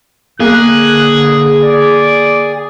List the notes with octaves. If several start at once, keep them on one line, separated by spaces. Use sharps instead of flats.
D3 A#3 G#4 F#6
D5